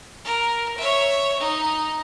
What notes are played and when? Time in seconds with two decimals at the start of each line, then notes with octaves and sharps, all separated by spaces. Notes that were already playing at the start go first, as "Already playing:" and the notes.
0.24 A#4
0.78 C#5 E5
1.40 D#4